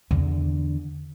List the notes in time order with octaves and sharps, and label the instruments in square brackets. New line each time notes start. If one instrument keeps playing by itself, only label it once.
[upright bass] E2 D3